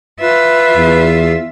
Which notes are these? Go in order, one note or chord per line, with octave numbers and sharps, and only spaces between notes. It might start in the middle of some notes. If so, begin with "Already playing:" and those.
F4 B4 E5
E2